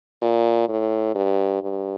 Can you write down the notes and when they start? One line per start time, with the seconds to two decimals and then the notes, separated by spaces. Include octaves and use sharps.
0.22 A#2
0.69 A2
1.15 G2
1.62 G2